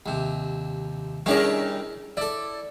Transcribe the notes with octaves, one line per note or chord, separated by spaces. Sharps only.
D#2 C3
G3 C#4 E4 G#4 A#4 A5
E4 A4 D5